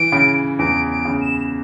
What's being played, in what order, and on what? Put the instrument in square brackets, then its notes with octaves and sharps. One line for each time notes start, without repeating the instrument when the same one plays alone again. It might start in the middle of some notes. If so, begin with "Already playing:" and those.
Already playing: [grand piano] E3 [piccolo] D7
[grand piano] C#3
[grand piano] E2 [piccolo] D7
[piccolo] D7
[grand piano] C#3
[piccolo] E7